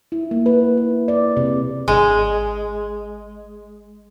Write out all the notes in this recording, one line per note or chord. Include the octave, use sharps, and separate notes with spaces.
E4
A#3
B4
E4
D5
C3
G#1 G#3